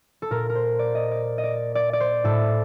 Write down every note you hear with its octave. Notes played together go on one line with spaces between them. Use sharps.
A4
A#2 A#4
A#4
C5
D5
D#5
D5
D#5
D5
D5
D5
C5
A2 A4